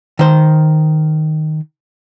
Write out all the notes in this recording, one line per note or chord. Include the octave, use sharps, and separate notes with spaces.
D#3 C5